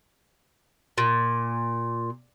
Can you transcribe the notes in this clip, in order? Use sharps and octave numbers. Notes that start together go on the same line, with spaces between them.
A#2